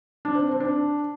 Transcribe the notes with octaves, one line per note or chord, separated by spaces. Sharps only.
D4
C4
C4
D4